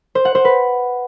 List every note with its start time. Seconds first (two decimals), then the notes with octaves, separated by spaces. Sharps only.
0.15 C5
0.25 F#5
0.35 C5
0.45 B4